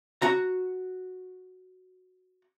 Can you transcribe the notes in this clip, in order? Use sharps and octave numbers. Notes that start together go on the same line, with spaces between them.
F#4 A#5